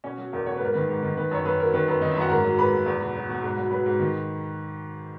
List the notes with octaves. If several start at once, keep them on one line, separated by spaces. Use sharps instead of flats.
B2 C#4 C#5
F#3
E2 A#4
B2 C#5
B4
G#2 A#4
D#3 B4
G#2
D#3
D#3 B4
F#2 C#5
F#2 B4
F#3 A#4
D#3 B4
F#2 B4
D#3 D#4 D#5
E4 E5
F#2 F#4 F#5
G#2 A#4 A#5
F#3
G#2 B4 B5
G#2
E2
B2
F#3
B2
G#2
F#3
F#3 B4 B5
G#2
D#3